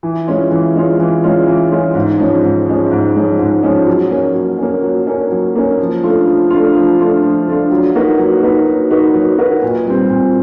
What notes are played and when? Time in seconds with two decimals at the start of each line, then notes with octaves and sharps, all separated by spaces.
0.03 E3
0.28 G#3 C#4 F4
0.51 E3
0.75 G#3 C#4 F4
0.99 E3
1.24 G#3 C#4 F4
1.47 E3
1.71 G#3 C#4 F4
1.95 G#2
2.19 F3 G#3 C#4
2.43 G#2
2.67 F3 G#3 C#4
2.91 G#2
3.15 F3 G#3 C#4
3.39 G#2
3.63 F3 G#3 C#4
3.87 F#3
4.11 A#3 C#4
4.35 F#3
4.58 A#3 C#4
4.83 F#3
5.07 A#3 C#4
5.31 F#3
5.56 A#3 C#4
5.79 F3
6.03 A3 D4 F4
6.27 F3
6.50 A3 D4 F4
6.75 F3
6.99 A3 D4 F4
7.23 F3
7.47 A3 D4 F4
7.71 F#3
7.95 A#3 D#4 F#4 B4
8.18 F#3
8.43 A#3 D#4 F#4 B4
8.67 F#3
8.91 A#3 D#4 F#4 B4
9.14 F#3
9.38 A#3 D#4 F#4 B4
9.62 A#2
9.87 G3 C4
10.10 A#2